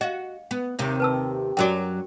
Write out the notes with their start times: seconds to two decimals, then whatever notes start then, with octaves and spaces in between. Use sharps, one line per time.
0.01 F#4 D#5 F5
0.51 B3
0.79 D#2 C3 D#3
1.00 B4 A5 E6
1.57 F#2 F#3 F#4 A#4 D5 G5